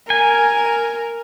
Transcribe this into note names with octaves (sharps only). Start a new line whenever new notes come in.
A#4 G#5